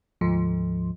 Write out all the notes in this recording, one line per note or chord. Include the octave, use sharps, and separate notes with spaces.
D2 G#2 F3